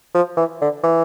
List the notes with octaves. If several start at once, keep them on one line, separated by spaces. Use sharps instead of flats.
F3
E3
D3
E3